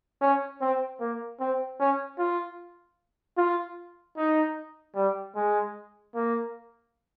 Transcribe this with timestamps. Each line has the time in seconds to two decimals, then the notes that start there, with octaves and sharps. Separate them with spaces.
0.21 C#4
0.61 C4
1.00 A#3
1.40 C4
1.80 C#4
2.18 F4
3.37 F4
4.17 D#4
4.95 G3
5.35 G#3
6.14 A#3